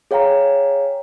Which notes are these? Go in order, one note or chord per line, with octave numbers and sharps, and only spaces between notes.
G#4 C#5 F5 G5 A#5